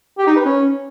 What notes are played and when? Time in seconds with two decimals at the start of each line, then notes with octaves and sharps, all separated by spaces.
0.18 G4
0.27 D#4
0.36 B4
0.45 C#4